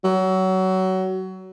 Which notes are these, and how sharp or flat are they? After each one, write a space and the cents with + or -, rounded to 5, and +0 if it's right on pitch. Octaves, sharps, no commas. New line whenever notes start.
F#3 +25